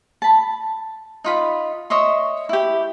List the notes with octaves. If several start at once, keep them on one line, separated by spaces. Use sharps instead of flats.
A5 B5
D#4 F4 B5
C#5 D#5 E5 C6
E4 G4